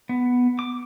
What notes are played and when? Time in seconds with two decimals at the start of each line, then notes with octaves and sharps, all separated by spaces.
0.09 B3
0.59 D6